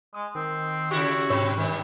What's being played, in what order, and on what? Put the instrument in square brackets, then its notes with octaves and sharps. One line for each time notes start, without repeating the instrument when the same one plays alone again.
[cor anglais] G#3 [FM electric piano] D#6
[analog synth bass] D#3 [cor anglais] C4
[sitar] C#3 E4 G4 [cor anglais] F#4
[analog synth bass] G#2 [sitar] B2 [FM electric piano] C#5 C#6
[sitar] G2 D#3